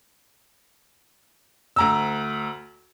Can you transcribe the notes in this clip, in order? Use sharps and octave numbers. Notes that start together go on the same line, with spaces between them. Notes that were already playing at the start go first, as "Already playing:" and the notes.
D2 A#5 E6